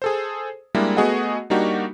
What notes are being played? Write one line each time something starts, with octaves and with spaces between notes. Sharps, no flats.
G#4 A4 C5
G3 G#3 A#3 D4 E4
A3 B3 F#4 G#4 D#5 F#5
G3 A#3 D4 D#4 F#4 G4